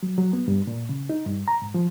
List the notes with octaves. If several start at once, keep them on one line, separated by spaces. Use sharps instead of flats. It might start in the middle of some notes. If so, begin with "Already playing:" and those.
F#3
F#3
B3
G2
A#2
C#3
D#4
G2
A#5
G#2
F3